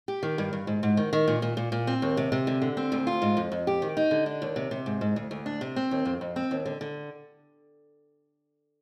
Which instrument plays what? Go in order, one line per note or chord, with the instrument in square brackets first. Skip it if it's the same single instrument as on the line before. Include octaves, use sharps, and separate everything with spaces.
[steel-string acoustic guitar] G4
D#3
G2
G2
G#2
G#2
D#3
D#3
A#2
A#2
A#2
A#2
C4
D#2
C3
C3
D3
D3
C4
D2
F4
G#2
F2
F2
G4
D#3
D#4
D3
D4
D#2
C3
C3
G#2
G#2
D2
D2
D4
C3
C4
D#2
F2
F2
C4
D#2
D3
D3